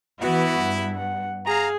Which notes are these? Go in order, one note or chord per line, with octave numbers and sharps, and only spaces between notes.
E3 B3 E4 F#4
G2
F#5
G#4 F5 A#5